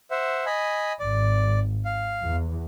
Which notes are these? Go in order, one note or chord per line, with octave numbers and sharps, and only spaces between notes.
C5 E5 F#5
D#5 G#5 B5
G#1 D5
F5
E2